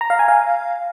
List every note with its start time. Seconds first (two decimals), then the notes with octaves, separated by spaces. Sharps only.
0.01 A#5
0.10 F5
0.19 G#5
0.28 F5